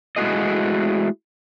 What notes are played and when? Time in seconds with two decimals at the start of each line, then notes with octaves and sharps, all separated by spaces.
0.16 G#3 A3 E4 F#4 G#4 D#5